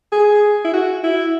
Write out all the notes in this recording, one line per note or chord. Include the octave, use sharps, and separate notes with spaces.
G#4
E4
F#4
E4